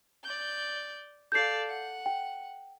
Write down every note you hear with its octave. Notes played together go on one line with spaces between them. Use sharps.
D5 G6
A4 D5 F5 G6 C7
F#5
G5